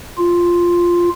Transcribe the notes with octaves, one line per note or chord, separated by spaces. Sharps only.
F4